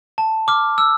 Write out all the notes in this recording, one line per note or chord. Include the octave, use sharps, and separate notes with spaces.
A5
D6 F6
E6